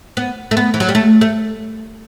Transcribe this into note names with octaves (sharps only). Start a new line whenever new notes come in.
B3
A3
B3
E3
F#3
G3
A3
A3